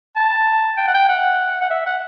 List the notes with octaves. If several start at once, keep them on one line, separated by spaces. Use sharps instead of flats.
A5
G5
F#5
G5
F#5
F#5
E5
F#5